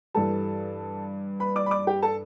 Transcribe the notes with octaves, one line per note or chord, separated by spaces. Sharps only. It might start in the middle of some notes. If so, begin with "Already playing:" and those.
G2 E3 G3 A4 A5
B4 B5
D5 D6
B5
D5 D6
G4 G5
A4 A5